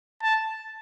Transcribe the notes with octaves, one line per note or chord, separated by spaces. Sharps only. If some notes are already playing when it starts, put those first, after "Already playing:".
A5